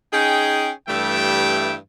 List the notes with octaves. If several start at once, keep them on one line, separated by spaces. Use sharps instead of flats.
C#4 D#4 G#4 G5
G2 E3 G3 A3 E5 G5